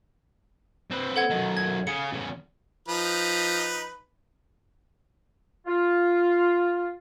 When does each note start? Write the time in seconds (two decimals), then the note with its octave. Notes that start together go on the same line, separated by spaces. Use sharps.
0.91 C4 B4
1.16 A4 F#5 G#6
1.30 F#2 D#3
1.57 G#6
1.87 C#3 G#4 C#7
2.13 E2 C#3
2.89 F3 D#4 B4
5.67 F4